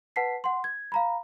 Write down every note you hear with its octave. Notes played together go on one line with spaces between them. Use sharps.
B4 F#5 A5 B6 C7
F#5 C6
G#6
F5 A#5 B5